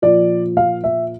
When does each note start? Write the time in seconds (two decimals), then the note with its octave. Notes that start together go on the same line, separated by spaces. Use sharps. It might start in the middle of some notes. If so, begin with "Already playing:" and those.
0.02 A#2 F3 D5
0.57 F5
0.84 E5